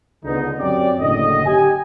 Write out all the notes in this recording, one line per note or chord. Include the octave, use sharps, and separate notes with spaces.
C#2 D3 B3 D#4
F#2 C4 C#4 G4 D5
F#1 A2 D3 D#5
G4 G#5